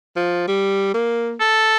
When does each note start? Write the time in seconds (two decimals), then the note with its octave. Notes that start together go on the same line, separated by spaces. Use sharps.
0.16 F3
0.48 G3
0.94 A#3
1.41 A4